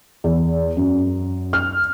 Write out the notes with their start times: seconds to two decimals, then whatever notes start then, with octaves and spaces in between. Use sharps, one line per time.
0.24 E2
0.77 F#2
1.53 F6